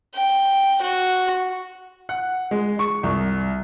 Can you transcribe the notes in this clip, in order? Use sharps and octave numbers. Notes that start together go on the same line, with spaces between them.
G5
F#4
F#5
G#3
C#6
C2